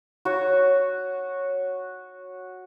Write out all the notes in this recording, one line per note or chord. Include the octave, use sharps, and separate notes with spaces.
F#4 C#5